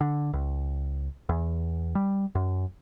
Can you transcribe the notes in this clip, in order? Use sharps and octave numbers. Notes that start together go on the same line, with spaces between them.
D3
C#2
E2
G3
F#2